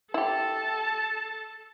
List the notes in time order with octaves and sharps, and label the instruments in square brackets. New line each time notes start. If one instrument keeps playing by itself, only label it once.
[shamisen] E4 G4 [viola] A4 A5